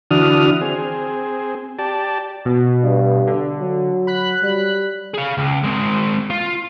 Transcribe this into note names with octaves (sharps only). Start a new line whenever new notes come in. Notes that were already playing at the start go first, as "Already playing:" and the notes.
D3 E3 D4 F#4 D#6 F6
C4 G#4
G4 D5 A5
B2
G2
D3
F#3
B5 F#6 B6
G3
G#4 F5
C#2
G#3 C4
F4